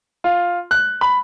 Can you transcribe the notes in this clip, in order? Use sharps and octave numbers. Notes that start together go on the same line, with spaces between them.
F4
F#6
B5